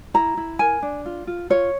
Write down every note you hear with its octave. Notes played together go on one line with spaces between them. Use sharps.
E4 A#5
E4
A#4 G#5
D4
F4
F4
F4 C#5